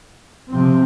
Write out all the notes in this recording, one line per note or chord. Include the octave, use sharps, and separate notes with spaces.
C3 F3 C4